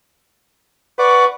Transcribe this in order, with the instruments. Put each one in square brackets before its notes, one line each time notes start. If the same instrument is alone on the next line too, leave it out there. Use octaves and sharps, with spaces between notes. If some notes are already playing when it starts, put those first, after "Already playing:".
[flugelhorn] B4 [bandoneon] D5 F#5 D6 [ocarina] C#6